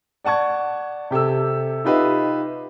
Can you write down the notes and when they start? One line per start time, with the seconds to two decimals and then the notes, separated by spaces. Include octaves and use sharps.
0.24 D5 F#5 A5 C#6 G#6
1.11 C3 G4 A4 E6
1.84 D#4 F4 G4 B4 D#5 E5